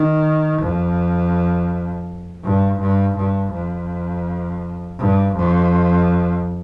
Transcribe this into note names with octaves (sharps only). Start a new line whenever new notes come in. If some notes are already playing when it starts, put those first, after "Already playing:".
Already playing: D#3
F2
G2
G2
G2
F2
G2
F2